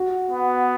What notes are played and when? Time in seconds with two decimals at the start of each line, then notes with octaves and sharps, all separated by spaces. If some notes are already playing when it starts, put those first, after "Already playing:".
Already playing: F#4
0.31 B3